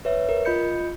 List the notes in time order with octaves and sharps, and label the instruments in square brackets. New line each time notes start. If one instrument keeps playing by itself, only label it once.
[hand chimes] B4 C#5 E5
A#4
F4 D#5 B5 G6 C#7